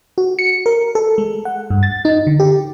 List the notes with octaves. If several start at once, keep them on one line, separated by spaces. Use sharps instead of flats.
F#4
C#7
A#4
A4
G#3
F#5
G2
A6
D#4
D3
G4